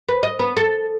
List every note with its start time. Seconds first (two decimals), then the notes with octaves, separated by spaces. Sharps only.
0.09 B4
0.23 D#5
0.39 B3
0.57 A4